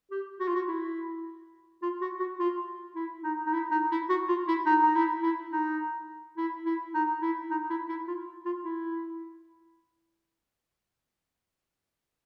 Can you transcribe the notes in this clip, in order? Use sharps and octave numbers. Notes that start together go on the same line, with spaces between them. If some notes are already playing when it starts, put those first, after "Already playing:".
G4
F#4
F4
F#4
E4
F4
F#4
F#4
F4
E4
D#4
D#4
E4
D#4
E4
F#4
F4
E4
D#4
D#4
E4
E4
D#4
E4
E4
D#4
E4
D#4
E4
E4
F4
F4
E4